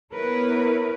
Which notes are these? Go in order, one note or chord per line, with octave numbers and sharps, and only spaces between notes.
B3 E4 A#4 B4 C#5